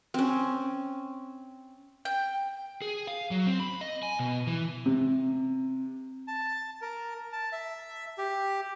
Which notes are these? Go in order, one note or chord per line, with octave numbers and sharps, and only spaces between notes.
C4 C#4
G5
G#4
F5
F#3
C4
B5
D#5
G#5
B2
E3
C3
A5
A#4
A5
E5
G4